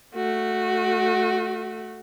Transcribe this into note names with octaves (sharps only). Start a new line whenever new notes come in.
A3 F#4